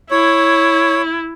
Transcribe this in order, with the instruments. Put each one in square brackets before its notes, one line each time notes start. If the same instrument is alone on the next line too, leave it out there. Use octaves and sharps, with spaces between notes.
[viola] E4 [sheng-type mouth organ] C#5